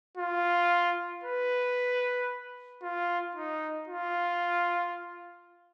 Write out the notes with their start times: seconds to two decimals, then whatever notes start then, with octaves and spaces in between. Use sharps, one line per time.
0.17 F4
1.24 B4
2.82 F4
3.35 D#4
3.87 F4